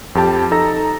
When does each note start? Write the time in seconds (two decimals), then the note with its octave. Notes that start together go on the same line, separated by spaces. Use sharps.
0.15 F2 G4 A5
0.51 D#4 A4 A#5 E6 A#6